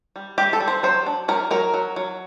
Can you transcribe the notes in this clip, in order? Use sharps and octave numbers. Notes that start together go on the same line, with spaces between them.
G3
G3 G4
A4
G3
C5
F#3 C5
D4
F#3 A#4
F#3 A#4
F#3
F#3